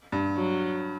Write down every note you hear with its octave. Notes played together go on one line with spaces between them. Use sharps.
G2
F#3